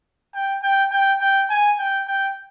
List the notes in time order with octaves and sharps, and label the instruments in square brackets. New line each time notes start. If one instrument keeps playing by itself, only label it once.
[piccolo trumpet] G5
G5
G5
G5
G#5
G5
G5